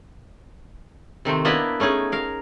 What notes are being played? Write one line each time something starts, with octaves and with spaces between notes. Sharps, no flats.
C3 D#3 A3 C4
A#3 B3 D4 E4 A#4 B4
A3 C#4 D#4 G#4
A#4 F5